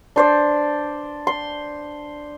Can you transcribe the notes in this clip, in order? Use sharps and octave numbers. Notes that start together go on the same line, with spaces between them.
D4 C5 D5
C6